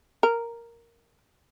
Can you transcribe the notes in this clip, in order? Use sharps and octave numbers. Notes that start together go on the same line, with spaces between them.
A#4